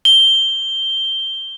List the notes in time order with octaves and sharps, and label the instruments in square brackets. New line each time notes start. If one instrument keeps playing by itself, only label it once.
[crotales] G7